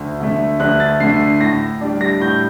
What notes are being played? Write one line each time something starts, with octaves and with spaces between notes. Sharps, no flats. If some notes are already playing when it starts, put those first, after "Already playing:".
Already playing: D2
D3 A3
D2 F#6
A6
D3 A3 C7
C7
A2 A#6
G3 D4
A#6
A2 G6